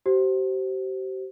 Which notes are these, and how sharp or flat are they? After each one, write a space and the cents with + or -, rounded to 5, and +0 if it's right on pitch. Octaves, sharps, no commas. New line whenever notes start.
G4 -40 C5 +0